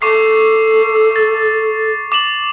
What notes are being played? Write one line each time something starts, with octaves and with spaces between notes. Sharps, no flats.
A4 C#6 D6 C7
A6
D6 E7 F#7